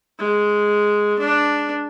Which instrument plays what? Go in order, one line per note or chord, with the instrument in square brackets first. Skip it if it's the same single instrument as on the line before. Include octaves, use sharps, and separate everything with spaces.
[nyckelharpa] G#3
D4